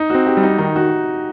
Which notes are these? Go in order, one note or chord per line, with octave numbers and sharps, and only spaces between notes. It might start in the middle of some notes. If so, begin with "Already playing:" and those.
Already playing: D#4
C4 F#4
G4
G3
D#4
D#3 D#4
F#4